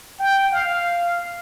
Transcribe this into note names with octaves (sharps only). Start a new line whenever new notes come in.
G5
F5